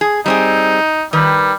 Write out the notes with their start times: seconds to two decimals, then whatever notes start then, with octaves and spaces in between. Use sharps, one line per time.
0.01 G#4
0.26 G3 C4 D#4 G#4
1.13 D#3 G3 B4